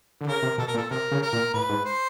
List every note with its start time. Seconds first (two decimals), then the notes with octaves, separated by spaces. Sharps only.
0.21 D3
0.27 C#3 A#4
0.43 C3
0.58 B2 A4
0.67 A#4
0.74 A#2
0.77 A4
0.90 C3 A#4
1.11 C#3
1.22 A#4
1.33 A#2
1.53 A2 B4
1.69 G#2
1.85 C5